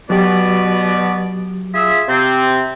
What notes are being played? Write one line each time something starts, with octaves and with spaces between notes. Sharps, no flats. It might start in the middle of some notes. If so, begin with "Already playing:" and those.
B2 F#3 B3 G4 D5
F4 G#4 E5
C3 C4